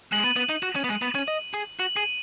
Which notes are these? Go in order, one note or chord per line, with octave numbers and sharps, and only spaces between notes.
G#3 F#7
B3 D#7
B3
D#4
F#4
C#4
B3
G#3
B3
C#4
D#5
G#4
F#4 F#7
G#4 D#7